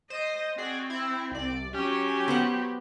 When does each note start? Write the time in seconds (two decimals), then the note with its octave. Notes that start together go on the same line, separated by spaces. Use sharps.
0.10 C5 D#5
0.58 C4 F#4 G#4 D5
0.90 E4
1.31 C2 D5
1.74 F#3 C#4 G4
2.28 B3 C5 F#5